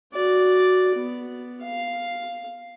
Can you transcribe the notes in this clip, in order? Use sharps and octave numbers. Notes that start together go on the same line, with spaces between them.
F#4 D5
B3
F5